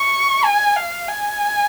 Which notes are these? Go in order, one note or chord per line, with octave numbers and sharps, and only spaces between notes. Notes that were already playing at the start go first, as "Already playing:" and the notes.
Already playing: C#6
G#5
F5
G#5